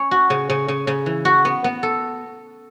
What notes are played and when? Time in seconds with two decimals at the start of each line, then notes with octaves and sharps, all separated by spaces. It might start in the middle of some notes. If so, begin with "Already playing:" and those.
Already playing: C#4 C#5
0.11 F#4
0.30 C#3
0.50 C#3
0.68 C#3
0.87 C#3
1.06 E3
1.25 F#4
1.45 B3
1.64 B3
1.83 A4